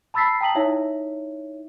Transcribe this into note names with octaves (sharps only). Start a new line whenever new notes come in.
A5 B5 E6 A6 B6 C7
G5 A5 A#5 D#6 B6 F#7
D#4 E4 C#5 E5